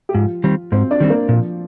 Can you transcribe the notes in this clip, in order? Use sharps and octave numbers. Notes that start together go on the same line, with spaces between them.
G4
G#2 F3 F4
D#3 G3 C4
G#2 C4 C5
D4 D5
D#3 G3 C4
A#3 A#4
A#2 F3 F4